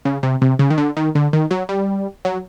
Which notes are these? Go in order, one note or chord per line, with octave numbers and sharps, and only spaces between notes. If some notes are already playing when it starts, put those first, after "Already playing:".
C#3
C3
C3
C#3
D#3
D3
D#3
D3
D#3
F#3
G3
F#3